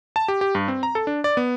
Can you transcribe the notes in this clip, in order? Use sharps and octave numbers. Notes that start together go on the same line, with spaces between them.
A5
G4
G4
G2
C4
A#5
A4
D4
D5
B3